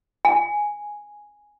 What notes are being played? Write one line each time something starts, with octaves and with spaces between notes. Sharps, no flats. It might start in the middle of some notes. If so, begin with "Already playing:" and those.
G#5